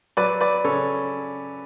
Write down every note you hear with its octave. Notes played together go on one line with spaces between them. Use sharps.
F#3 B4 D5
B4 D5
C#3 A4 C#5